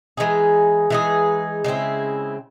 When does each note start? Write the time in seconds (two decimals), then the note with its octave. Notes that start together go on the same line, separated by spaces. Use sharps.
0.17 E3 G#3 D#4 G#4
0.90 E3 G#3 D#4 G#4
1.64 C#3 G#3 C4 E4